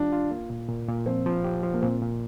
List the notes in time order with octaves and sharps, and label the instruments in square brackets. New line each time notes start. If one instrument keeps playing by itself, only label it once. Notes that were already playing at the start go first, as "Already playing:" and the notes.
Already playing: [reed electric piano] D#3 G3 F4 G4 [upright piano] D4
[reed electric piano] F4
A#3
A#2
A#2
A#2
[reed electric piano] F3 [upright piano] C4
[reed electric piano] F3
G4
F3
[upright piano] A#3
[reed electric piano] A#2 [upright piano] C4
[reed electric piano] A#2